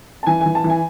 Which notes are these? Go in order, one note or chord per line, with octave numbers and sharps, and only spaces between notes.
A5
E3 G#5
G#5
E3
A5
E3
G#5